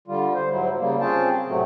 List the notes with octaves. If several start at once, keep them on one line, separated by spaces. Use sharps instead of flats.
D3 G3 F4
C5
G#2 F#3 E4
C#3 G3 A#3
C4 C#4 F4 G#4 G5 A5
A2 C3 F#3 A3